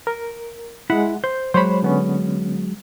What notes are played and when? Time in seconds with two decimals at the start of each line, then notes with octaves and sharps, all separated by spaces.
0.07 A#4
0.90 G#3 E4 F#5
1.24 C5 G6
1.54 F#3 G#3 C5 C#5 B5
1.83 D3 B3 C#4